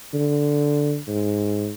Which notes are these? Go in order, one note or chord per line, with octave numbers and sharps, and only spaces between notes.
D3
G#2